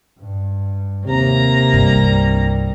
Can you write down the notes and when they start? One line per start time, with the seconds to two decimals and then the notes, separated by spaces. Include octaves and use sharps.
0.19 G2
1.07 D#2 C3 A#3 A#5
1.74 C2 G2 G3